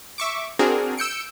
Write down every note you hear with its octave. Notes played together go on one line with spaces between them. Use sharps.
E5 C#6 D6
C4 D4 F#4 G#4 A#4
E6 G6 C#7 D7